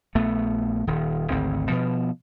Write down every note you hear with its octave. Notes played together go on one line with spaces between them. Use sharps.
A#1 A3 B3
D#1 D#3
G#1 D2 C4
B2 F3